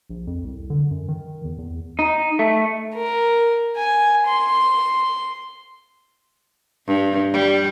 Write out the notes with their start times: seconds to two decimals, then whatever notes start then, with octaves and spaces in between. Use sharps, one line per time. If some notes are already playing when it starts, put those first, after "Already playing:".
0.09 A#1
0.27 F2
0.45 C2
0.70 D3
0.91 F#2
1.08 D#3
1.44 E2
1.58 E2
1.99 D#4
2.39 A3
2.95 A#4
3.77 G#5
4.27 C6
6.87 G2
7.33 G3